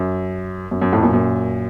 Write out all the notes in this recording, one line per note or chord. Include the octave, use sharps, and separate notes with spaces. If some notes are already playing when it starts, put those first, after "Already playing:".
Already playing: F#2
F#2
F#2
F2 A2
F#2 A#2
F#2 A#2